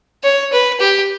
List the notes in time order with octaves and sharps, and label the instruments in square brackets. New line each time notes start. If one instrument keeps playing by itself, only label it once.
[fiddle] C#5
B4
G4